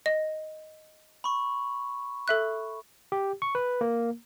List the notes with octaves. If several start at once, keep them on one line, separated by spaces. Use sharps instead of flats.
D#5
B5 C#6
A4 E5 F#6
G4
C#6
B4
A#3